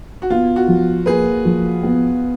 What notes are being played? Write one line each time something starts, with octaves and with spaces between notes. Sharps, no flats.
F#4
B3 F4
F#4
F3
A#3 G#4 B4
F3
B3